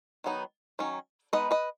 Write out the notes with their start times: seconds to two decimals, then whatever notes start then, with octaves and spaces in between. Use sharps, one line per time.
0.24 D#3 F#3 B3 D#4
0.79 D#3 F#3 C#4
1.33 G#3 B3 D#4 B4 D#5
1.51 B4 D#5